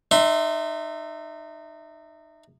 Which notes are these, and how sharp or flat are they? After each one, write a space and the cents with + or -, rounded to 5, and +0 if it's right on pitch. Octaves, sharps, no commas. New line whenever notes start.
D#4 -30 E5 +0 C6 +0